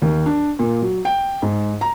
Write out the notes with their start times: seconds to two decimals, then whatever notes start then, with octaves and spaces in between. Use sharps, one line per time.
0.02 D#2
0.26 D4
0.59 A#2
0.82 F#3
1.05 G5
1.42 G#2
1.81 A#5